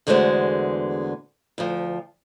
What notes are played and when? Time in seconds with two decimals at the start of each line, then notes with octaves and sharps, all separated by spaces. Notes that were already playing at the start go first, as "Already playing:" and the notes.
0.07 E2 D3 G#3 A3 F#4 C5
1.58 D2 F3